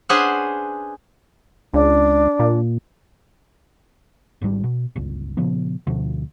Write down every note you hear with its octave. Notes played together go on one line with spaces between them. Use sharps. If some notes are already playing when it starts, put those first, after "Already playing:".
C#4 D4 G#4 B4 C5 F#5
C#2 D4
A#2
G#1 G#2 C#3 G3
B2
G1 C#2
A#2 C#3 F3 B3
D2 B2 F3